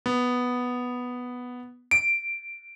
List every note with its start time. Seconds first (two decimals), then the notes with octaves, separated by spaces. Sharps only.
0.06 B3
1.91 D7